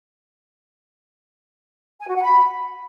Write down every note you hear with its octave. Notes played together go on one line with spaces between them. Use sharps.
G#5
F#4
F#5
B5